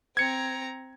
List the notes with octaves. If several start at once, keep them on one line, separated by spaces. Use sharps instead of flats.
C4 A#5 G#6 C#7